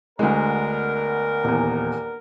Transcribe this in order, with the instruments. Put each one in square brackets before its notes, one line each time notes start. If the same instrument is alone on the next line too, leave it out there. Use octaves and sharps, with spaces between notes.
[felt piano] D2 G#3 [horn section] B3 D4 A#4
[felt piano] D#1 E2